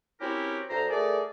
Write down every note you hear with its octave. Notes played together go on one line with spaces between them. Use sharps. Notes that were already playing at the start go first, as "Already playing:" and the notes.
C4 C#4 E4 F#4 G4 A#4
D2 C5 A#5
A3 G#4 A#4 D5